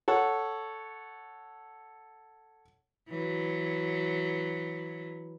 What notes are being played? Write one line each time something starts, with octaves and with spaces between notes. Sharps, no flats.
A4 C#5 F#5
E3 F#3